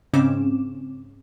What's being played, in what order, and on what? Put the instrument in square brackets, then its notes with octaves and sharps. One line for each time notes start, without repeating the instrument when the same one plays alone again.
[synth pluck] G#2 C#3 C4 C#4 D6 E7